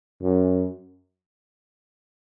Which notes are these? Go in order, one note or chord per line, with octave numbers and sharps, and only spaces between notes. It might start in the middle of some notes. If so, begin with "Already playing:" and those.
F#2